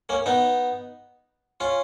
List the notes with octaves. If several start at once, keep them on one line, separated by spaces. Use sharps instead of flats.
A#3 C#4
B3 D#4
C#4 F4